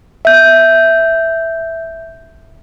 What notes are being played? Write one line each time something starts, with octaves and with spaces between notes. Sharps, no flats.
E5 G6